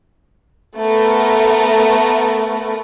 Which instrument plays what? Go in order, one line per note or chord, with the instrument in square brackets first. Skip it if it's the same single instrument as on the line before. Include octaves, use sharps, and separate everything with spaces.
[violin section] A3 B3 A#4